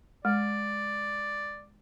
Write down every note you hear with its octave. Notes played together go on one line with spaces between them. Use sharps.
G#3 D5